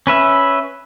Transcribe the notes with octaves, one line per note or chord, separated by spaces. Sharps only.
C#4 B4 E5